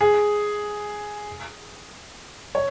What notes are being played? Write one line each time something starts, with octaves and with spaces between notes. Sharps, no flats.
G#4
C#5